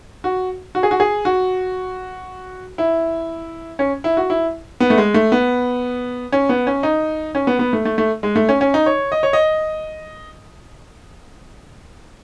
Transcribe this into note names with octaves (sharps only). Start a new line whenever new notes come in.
F#4
F#4
G#4
F#4
G#4
F#4
E4
C#4
E4
F#4
E4
B3
A3
G#3
A3
B3
C#4
B3
C#4
D#4
C#4
B3
B3
A3
A3
A3
G#3
A3
C#4
C#4
D#4
C#5
D#5
C#5
D#5